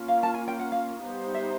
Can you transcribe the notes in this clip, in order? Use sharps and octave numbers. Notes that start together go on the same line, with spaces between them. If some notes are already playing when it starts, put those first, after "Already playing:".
Already playing: A#3 C#4 F4
F5
A5
G#5
G5
F#5
F5
G3 B3 D#4 G4 C5
E5